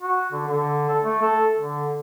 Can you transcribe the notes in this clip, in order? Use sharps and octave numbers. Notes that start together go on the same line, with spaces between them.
F#4
D3
D3
A4
A3
A4
D3